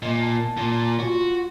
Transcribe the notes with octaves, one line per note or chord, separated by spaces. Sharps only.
A#2 D#5
A5
A#2
F4 F#4